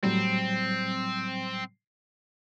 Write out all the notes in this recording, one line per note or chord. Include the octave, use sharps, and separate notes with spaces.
A2 F#3 G3 C4